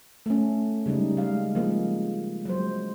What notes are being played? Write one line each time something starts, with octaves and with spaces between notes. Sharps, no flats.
A3 C#4
C#3 G3 G#3 D#4
G#3 F5
F3 G#3 A#3
F#3 G#3 C5